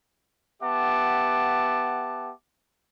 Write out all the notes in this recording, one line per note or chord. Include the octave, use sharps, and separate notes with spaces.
B3 G4 E5 F#5 A5 D6